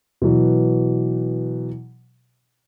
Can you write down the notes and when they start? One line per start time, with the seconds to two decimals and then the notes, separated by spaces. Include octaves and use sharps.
0.21 B2 E3 F#3